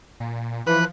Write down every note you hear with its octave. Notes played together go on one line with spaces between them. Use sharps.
A#2
E3 F3 B4 F#6